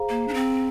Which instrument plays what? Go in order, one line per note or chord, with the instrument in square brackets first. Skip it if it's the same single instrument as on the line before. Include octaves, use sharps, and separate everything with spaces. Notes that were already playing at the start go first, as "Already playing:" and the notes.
Already playing: [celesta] G#4 C5 F5 A#5
[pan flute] A#3
D4
C4